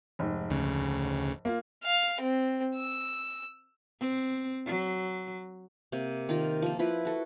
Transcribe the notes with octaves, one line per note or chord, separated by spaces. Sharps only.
F1 G#2
D2 C#3
A#3 F4
F5
C4
E6
C4
F#3
C3 A#3
D#3 F4 A#4
F3 A#3
F3 E4 B4
F#4 A4